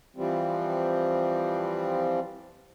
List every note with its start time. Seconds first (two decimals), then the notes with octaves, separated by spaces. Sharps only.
0.16 E3 F3 G3 C4